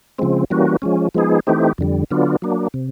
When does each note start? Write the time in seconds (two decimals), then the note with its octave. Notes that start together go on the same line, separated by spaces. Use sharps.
0.18 C#3 F3 G#3 C4
0.50 E3 G3 A#3 C#4 F#4
0.82 F3 G#3 C#4
1.14 F3 G#3 B3 D#4 G#4
1.47 E3 A3 C4 D#4 G4
1.78 F2 D3 G3
2.11 D3 F#3 B3 D4 F4
2.42 F#3 A#3 D4
2.74 C3